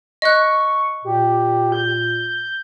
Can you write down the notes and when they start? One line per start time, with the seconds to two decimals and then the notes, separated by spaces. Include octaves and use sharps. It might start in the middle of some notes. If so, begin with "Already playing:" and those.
0.22 D#5 C#6 F#6
1.05 A#2 G4
1.72 G6